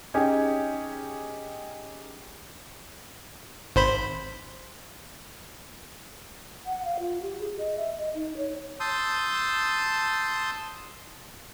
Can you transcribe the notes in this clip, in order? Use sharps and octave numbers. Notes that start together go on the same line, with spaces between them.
C#4 D#4 G4 G#4
G#1 C5 B5
F#5
F5
F4
G4
G#4
D#5
E5
D#5
D#4
C#5
A5 C6 D#6 E6 G6